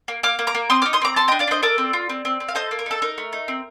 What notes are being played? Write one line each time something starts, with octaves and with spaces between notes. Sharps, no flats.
A#3
A#3 D6 F6
A#3
A#5 D6
A#3
C4 C6 D#6
D#4 D6 F6
C6 D#6
C4 A#5 D6
A4 A5 C6
D4 D#5 G5
D5 F5
D4 C5 D#5
A4 A#4 D5
C4
F4
C4
C4
C4
F5
A4 C5 D#5
A#3
A#4
D#4 A4
D#4 A#4
A3
D#4
C4